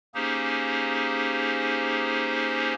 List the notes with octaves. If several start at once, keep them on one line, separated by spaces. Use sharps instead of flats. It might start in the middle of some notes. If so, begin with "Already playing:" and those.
A#3 C#4 D#4 G4 G#4 C5